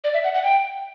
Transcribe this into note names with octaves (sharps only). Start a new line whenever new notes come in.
D5
E5
F#5
F#5
G5